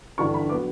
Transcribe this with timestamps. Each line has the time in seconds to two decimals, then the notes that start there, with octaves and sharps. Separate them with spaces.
0.18 G1 G2 E3 C#6
0.34 B5
0.49 F#3 B3 D6